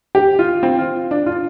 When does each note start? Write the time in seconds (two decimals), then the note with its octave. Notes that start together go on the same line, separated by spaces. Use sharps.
0.15 G4
0.39 F4
0.63 C4
0.79 F4
1.11 D4
1.26 F4